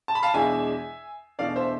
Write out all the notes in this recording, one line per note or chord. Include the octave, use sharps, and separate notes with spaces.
A5
B5
F5 A5
E2 B2 G#3 D4 E5 G#5
E2 B2 A3 D4 D5 F5
C5 E5